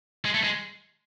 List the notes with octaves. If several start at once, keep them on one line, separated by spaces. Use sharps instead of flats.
G#3
A3
G#3